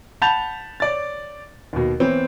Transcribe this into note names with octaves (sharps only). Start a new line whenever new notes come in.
F#5 A5 B5 G6 A6 F7
C#5 D5 A6
D#2 B2
E3 B3 C4 C#5